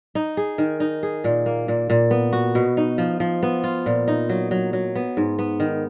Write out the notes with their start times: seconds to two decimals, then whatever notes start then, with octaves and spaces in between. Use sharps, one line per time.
0.15 D#4
0.37 G#4
0.58 D#3
0.80 D#4
1.03 G#4
1.24 A#2
1.46 A#3
1.68 A#2
1.90 A#2
2.11 B3
2.33 F#4
2.55 B2
2.77 D#4
2.98 F3
3.20 F3
3.43 B3
3.64 F4
3.86 A#2
4.08 D#4
4.29 F#3
4.51 F#3
4.73 F#3
4.95 B3
5.17 G#2
5.39 B3
5.60 D#3